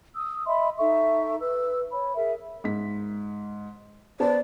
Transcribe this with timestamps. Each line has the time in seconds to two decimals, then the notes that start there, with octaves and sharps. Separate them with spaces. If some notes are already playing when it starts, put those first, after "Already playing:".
0.14 D#6 E6
0.46 D#5 E5 B5 C6
0.78 D#4 A4 E5 C#6
1.40 B4 E6
1.92 C#5 B5
2.15 G#4 A#4 E5
2.64 G#2 B6
4.20 B3 C5 D5 A5